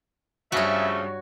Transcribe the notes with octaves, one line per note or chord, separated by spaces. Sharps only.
G2 C#3 F3 A3 F#4 C#5 E5